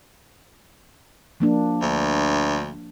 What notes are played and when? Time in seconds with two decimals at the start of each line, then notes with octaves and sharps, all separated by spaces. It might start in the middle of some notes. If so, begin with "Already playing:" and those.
1.40 F3 A#3 D4
1.81 D2